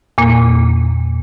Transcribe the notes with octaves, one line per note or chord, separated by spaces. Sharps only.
E2 A#2 A#3